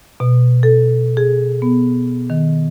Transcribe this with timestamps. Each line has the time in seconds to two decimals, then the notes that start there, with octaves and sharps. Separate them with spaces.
0.20 B2
0.63 A4
1.17 G#4
1.62 B3
2.30 D#3